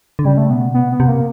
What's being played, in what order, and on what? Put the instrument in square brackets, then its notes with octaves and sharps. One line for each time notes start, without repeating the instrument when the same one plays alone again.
[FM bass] D3
[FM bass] C#3 [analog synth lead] G3
[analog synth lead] A3
[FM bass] B2 [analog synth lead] B3
[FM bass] C3 [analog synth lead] B3
[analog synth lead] B3
[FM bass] C3
[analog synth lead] A#3